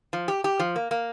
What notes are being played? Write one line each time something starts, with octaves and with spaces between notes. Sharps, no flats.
F3
G4
G4
F3
A#3
A#3